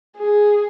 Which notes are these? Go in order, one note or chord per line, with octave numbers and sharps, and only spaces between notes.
G#4